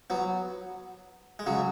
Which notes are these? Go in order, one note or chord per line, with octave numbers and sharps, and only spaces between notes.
F#3 B3
G#3
C#3 F#3